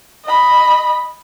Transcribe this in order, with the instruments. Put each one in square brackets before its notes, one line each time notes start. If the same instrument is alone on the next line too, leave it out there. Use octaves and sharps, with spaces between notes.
[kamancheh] D#5 B5